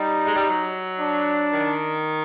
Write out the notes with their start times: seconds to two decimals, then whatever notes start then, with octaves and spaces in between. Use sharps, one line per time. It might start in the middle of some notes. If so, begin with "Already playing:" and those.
Already playing: G3 D#4
0.26 G#3
0.35 G3
0.46 F#3
0.99 D4
1.53 D#3